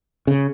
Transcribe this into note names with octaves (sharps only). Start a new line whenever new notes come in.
C#3